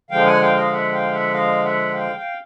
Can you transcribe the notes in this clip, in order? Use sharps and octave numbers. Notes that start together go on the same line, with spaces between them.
D3 F3 G#3 F5 G5
F#5 G#5
F5 G5
D#5 F5
E5 F#5
F5 G5
E5 F#5
D#5 F5
E5 F#5
F5 G5
F5 G5